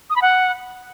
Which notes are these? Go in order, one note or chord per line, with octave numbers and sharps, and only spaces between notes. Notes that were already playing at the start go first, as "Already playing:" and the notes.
D#6
B5
F#5